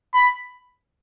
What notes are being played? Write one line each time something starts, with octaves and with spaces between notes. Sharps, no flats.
B5